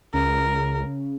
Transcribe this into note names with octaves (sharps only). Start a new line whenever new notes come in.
C#2 C#3 A#4